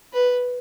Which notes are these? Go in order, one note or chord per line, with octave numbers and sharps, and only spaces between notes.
B4